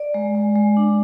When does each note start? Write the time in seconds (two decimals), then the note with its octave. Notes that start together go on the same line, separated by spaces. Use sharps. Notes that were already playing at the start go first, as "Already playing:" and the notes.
Already playing: D5
0.14 G#3
0.35 G#3
0.56 G#3
0.77 D4